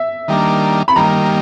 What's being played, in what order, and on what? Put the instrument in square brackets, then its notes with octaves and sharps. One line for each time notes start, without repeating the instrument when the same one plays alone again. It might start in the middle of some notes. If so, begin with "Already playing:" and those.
Already playing: [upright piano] E5
[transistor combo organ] D#3 G3 A#3 D4
[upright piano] B5
[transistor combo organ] D#3 G3 A#3 [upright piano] A#5